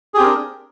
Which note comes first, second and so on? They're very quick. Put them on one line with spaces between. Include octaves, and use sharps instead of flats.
G#4 G4 C4 A#4 D4